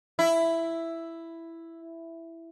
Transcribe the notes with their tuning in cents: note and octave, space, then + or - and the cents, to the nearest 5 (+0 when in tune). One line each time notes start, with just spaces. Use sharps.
E4 +5